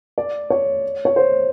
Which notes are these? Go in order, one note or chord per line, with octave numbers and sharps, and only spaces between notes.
D5
C#5
C#5
C5